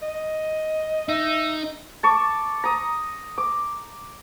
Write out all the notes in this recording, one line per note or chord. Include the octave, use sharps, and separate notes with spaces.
D#5
D#4 E5
A5 C#6 D6
A#5 D#6
D6